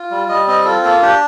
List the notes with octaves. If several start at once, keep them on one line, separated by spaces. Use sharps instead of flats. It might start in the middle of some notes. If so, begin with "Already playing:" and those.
Already playing: F4
G3
G3 D#5
C4 D#5
F4 A4
A#3 A4
D4 G4